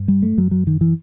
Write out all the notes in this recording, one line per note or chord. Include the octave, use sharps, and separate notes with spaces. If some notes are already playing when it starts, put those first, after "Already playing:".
Already playing: G2
G3
A3
F#2 F#3
F#3
D#3
E3